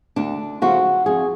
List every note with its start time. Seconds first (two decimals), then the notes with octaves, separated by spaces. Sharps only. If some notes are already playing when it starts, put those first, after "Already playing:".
0.16 D2 D4
0.62 C#3 F3 A3 F#4
1.06 F2 G#4